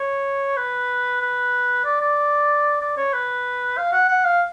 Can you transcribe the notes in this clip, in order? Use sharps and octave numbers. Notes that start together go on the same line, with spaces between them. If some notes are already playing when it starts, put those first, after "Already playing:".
Already playing: C#5
B4
B4
D5
D5
D5
C#5
B4
F5
F#5
F#5
F5